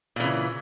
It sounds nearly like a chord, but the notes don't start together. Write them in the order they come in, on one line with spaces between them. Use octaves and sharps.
A#2 E3 C#3